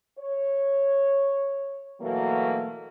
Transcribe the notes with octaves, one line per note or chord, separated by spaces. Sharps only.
C#5
B2 E3 F#3 A3 A#3